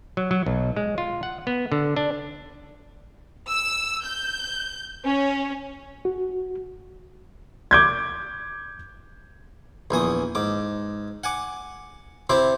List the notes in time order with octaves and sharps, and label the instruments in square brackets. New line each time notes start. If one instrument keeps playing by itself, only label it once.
[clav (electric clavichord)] F#3
F#3
B1
G#3
F4
F#5
B3
D3
D4
[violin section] E6
G6
C#4
[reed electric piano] F#4
[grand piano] D6 G6 G#6
[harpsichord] A#1 E2 G#5 D#6
G#2 D6
F#5 G#5 D6
C3 E4 C5 D6